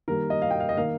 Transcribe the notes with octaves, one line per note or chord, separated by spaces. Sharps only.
D#3 G3 A#3 A#4
D#5
F5
G5
F5
D#5
D#3 A#3 F5